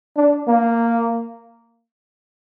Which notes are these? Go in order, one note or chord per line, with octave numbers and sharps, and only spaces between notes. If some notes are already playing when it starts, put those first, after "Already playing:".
D4
A#3